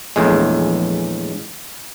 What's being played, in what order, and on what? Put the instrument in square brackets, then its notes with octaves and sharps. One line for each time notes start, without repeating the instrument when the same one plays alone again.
[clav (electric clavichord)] A#1 E2 A2 G#3